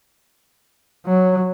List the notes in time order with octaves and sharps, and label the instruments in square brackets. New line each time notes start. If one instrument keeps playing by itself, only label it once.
[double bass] F#3